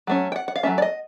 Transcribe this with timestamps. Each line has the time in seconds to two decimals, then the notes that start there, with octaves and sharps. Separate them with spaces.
0.07 F#3 A3 C#4
0.32 G5
0.36 F#5
0.48 F#5
0.56 F5
0.63 F#3 A3 C#4 E5
0.78 D5
0.82 D#5